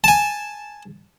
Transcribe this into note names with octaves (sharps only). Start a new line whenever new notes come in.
G#5 A5